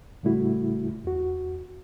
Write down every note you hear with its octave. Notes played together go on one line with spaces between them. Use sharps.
A2 C#3 G3 A3 E4 F#4
E2 F#4